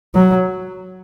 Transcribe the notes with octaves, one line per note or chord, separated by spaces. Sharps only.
F#3